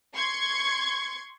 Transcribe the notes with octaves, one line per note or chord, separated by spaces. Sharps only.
C6 C#6 G#6